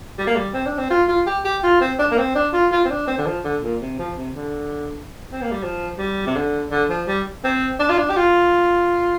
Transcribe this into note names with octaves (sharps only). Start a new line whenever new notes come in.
G3
A#3
G3
C4
D4
C4
F4
F4
G4
G4
F4
C4
D4
A#3
C4
D4
F4
F4
C4
D4
C4
D3
F3
D3
A#2
C3
F3
C3
D3
C4
A#3
G3
F3
G3
C3
D3
D3
F3
G3
C4
D4
F4
D4
G4
F4